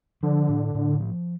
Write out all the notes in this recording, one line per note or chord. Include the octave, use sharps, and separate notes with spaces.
D3 F3
A2
A2
F3